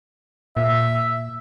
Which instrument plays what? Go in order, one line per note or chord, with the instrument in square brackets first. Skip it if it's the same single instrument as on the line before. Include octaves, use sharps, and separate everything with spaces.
[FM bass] A#2 [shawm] E5